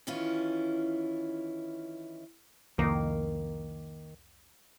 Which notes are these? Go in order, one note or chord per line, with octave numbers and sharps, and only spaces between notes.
D#3 E3 C#4 E4 F4
C2 F2 D#3 A#3